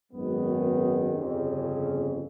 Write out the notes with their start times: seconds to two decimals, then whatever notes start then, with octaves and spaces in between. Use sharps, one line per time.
0.12 G#1 F#2 D#3 G#3 B3
1.15 G1 F2 C#3